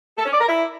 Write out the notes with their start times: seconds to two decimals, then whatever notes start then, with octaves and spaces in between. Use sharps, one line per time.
0.18 A4
0.25 C#4
0.33 D5
0.40 A#4
0.48 E4